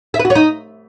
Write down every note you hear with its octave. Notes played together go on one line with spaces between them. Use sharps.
E5
B4
F#4
C#5
D#4